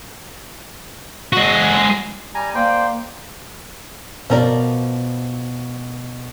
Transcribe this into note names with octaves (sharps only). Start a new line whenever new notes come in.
G#3 F#4
G3 G#5 A#5
A#3 C5 D5 G5
B2 F3 A#4 D5